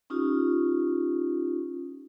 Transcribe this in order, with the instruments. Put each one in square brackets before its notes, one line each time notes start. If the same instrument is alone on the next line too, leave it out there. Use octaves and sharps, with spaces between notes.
[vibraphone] C#4 D#4 F4 G4